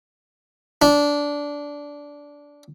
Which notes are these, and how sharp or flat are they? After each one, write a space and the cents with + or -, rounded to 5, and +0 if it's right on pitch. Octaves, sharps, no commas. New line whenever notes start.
D4 -15